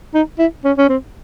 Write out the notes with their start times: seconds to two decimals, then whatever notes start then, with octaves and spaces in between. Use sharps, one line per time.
0.14 D#4
0.39 E4
0.64 C#4
0.77 C#4
0.89 C4